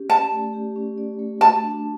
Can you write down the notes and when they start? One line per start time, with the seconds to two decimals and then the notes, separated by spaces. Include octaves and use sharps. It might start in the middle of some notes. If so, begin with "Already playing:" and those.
Already playing: C#4 G4
0.09 D5 A5
0.32 A3
0.53 G4
0.76 C#4
0.98 D5
1.19 A3
1.41 F#4 A5
1.63 D4